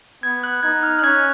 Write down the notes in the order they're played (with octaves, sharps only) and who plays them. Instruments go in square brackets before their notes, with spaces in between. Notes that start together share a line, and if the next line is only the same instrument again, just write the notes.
[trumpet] B3 [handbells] G#6
[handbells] F#6
[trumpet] D#4 [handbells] G#6
[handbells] F6
F#6
[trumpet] C#4 [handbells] G#6